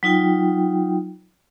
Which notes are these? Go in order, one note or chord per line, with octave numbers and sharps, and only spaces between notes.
F#3 D#4 F4 G5